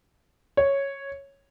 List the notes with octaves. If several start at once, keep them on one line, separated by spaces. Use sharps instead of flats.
C#5